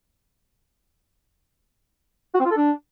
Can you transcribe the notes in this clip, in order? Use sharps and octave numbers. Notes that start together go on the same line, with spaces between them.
F#4
C4
F4
A4
D4